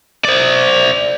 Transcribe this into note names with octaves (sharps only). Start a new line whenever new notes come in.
C5 D5